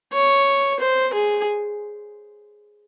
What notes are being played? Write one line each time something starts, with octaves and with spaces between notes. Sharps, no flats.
C#5
C5
G#4